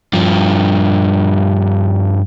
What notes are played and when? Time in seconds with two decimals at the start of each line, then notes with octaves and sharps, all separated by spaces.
0.13 G2 F3